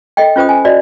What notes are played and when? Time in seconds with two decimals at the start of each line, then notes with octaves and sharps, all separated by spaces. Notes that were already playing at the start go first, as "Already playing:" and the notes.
0.17 A4 D#5 G5
0.36 C#4 F4 C5 G5 D#6
0.49 G#5
0.65 F#4 D5 D#5